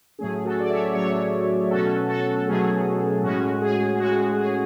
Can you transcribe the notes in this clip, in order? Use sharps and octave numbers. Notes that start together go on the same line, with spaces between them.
A2 F#3 A3 C#4 G#4
F#4 A4
D5
C#5 E5
A2 F#3 A3 C#4 A4 C#5
B2 F#3 A3 C#4 F#4 A4
F#4 A4
B2 F#3 A3 C#4 G#4
A2 G#3 C#4 F#4
G#4
A2 G#3 C#4 F#4
G#4